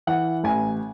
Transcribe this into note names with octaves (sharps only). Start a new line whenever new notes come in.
E3 F#5
A1 G#5